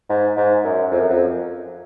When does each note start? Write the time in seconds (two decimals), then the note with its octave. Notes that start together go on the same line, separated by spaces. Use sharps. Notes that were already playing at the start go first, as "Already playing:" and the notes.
0.10 G#2
0.37 G#2
0.64 F#2
0.91 F2
1.00 F#2
1.09 F2